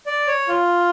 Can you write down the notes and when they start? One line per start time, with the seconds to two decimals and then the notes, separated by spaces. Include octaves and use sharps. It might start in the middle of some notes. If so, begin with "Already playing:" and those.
0.06 D5
0.27 C#5
0.48 F4